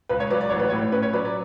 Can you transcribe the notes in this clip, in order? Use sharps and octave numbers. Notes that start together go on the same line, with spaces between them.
C#2 B4
C#5
F#3 B4 D5
D5
A1 C#5
B4
C#5
A2
C#4 B4
C#5
F#3 B4 D5
D5